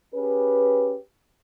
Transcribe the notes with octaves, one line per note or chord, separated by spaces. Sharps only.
C#4 G4 G#4 B4